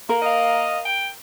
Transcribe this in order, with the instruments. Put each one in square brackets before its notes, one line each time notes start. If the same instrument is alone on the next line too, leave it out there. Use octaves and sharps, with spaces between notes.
[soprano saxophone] A#3 [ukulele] A#4
[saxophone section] D#5 F5
[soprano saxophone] G5